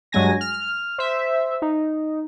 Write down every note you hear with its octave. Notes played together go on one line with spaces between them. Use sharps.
G2 F#3 G#3 G#5 A#6
F6
C5 E5
D#4